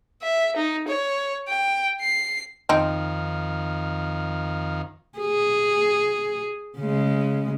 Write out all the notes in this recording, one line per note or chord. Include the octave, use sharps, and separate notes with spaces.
E5
D#4
C#5
G5
C7
F2 D#3 C4 D#4 F5
G#4
C#3 G#3